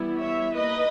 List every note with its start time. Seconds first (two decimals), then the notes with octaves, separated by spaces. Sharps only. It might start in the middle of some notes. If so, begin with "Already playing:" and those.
Already playing: E3 G3 B3 E4
0.19 C#5 E5
0.54 G3 A#3 D#4 B4 D#5